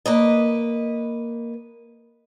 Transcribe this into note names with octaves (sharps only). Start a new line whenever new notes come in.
A#3 B4 D#5